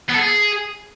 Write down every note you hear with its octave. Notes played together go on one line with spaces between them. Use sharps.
B3
A4
G#4